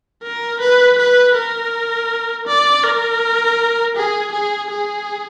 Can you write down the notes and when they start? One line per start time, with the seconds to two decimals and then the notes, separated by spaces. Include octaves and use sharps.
0.23 A#4
0.60 B4
0.98 B4
1.34 A#4
2.47 D5
2.84 A#4
3.96 G#4
4.33 G#4
4.70 G#4